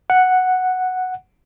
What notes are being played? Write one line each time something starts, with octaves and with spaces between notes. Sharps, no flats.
F#5